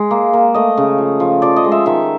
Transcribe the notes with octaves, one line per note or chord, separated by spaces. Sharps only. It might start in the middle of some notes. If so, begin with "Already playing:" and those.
Already playing: G#3
A#3
A#3
A3 D#5
C#3
F3
F3
F3 D5
D#5
G#3
E5
D#3 E5